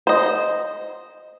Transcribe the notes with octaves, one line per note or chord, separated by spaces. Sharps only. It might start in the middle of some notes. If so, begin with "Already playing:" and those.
C5 D#5